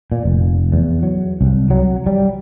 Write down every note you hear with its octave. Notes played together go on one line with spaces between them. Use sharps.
A#2
F1
E2
F#3
C2
F#3
G3